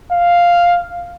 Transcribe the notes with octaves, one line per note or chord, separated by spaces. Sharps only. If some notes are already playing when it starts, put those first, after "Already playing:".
F5